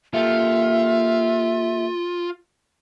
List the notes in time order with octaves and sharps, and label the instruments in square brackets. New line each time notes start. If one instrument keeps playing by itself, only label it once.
[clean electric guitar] A#3 G4 A4 [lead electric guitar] F4 [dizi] E5